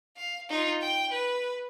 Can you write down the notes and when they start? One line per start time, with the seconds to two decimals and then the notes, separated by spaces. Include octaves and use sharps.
0.17 F5
0.49 D#4 F4
0.81 G5
1.12 B4